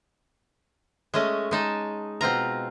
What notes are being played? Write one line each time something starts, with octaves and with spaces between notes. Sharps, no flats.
G#3 A3 C#4 D#5
G#3 D#4 A5
B2 C4 F4 A#5